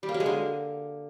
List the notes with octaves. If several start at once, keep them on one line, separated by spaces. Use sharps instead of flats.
G3
A#3
F#3
G#3
D3